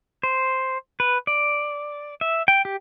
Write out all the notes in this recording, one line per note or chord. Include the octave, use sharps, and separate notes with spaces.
C5
B4
D5
E5
G5
G4